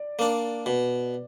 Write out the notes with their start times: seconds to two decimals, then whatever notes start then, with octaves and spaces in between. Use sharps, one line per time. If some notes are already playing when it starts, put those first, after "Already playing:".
Already playing: D5
0.19 A#3 D4
0.66 B2